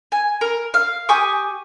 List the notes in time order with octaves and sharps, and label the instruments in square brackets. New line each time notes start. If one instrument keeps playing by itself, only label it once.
[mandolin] G#5
A#4
F5
G4 G#5 C#6 D#6